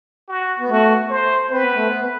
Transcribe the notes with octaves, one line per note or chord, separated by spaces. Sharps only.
F#4
B3
A3 F#4
C5
C4 B4
B3
A3
B3